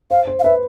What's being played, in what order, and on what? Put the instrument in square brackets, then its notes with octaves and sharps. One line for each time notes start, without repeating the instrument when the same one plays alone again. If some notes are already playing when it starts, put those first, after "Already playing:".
[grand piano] C5 [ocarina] F5
[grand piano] C5
[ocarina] F5
[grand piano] B4 [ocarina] E5